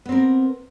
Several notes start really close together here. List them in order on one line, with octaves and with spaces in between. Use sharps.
B3 C4 A#4